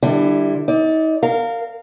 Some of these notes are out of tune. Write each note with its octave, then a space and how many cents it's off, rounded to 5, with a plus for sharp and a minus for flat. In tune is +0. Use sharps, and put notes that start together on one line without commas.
D3 +30 G3 +0 E4 +10
D#4 +35 D5 +0
A#4 -25 F5 +0